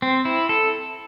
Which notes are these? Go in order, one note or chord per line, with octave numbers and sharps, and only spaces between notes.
C4
E4
A4